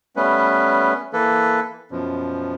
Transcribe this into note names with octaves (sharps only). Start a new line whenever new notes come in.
G3 A3 B3 C#4 B4
E3 A#3 A4 B4
F#2 B2 F3